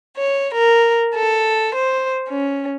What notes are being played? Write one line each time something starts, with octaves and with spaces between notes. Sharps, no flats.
C#5
A#4
A4
C5
C#4